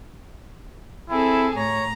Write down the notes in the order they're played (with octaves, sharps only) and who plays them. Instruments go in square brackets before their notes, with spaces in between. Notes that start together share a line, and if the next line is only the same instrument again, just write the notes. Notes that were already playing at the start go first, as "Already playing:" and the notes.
[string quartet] C4 G#4 A4 [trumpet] E4
[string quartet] A2 A#5 [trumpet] C#5